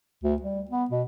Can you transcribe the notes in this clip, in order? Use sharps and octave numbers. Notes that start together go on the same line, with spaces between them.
D2
G3
B3
B2